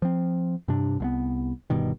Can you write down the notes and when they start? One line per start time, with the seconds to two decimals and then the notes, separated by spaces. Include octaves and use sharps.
0.02 F3 C4
0.68 G2 C3 D4
1.00 C2 G#3 B3
1.70 G1 G2 B2 D#3